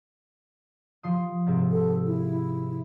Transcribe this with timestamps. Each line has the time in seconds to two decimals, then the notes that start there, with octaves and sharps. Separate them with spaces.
1.03 F3 C6 D#6
1.46 G#2 C3 C4
1.71 A4
2.06 E4